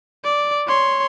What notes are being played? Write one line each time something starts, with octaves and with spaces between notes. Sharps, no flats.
D5
C#5 C6